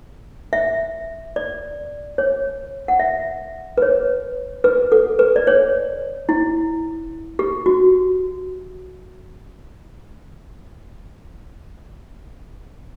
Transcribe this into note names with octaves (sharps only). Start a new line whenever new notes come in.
E5
D5
C#5
F#5
E5
B4
C#5
B4
A4
B4
D5
C#5
E4
G4
F#4